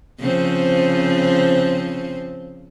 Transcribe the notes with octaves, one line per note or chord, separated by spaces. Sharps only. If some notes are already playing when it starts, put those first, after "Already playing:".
C#3 F3 C4